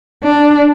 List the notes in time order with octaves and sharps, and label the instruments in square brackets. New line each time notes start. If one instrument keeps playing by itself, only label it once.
[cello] D4